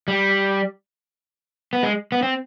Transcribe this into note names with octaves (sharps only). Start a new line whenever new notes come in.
G3
B3
G#3
B3
C4